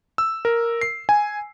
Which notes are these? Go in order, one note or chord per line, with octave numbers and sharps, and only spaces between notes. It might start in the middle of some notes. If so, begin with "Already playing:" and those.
E6
A#4
C7
G#5